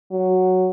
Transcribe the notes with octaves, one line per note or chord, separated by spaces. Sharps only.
F#3